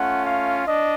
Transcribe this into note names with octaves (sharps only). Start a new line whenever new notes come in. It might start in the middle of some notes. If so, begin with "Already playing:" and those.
Already playing: A3 C#4 F4 F#5
F5
D4 D#5